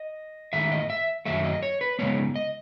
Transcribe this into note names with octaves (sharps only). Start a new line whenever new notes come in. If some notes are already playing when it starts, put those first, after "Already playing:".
Already playing: D#5
G#2 D#3 A3 E5
D#5
E5
F#2 D#3 F#3 A3 E5
D#5
C#5
B4
C#3 G#3 B3 C#5
D#5